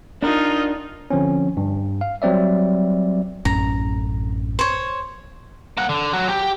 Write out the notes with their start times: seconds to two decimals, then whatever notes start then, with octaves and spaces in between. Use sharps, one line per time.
0.22 D4 D#4 F4 A#4
1.10 D3 F3 C4 C#4
1.57 G2
2.01 F5
2.22 F#3 G3 C4 D5 E5
3.45 A1 F#2 C#4 A#5
4.59 C5 C#5
5.77 A#3 F#5
5.89 D3
6.13 F#3 F#4
6.29 G4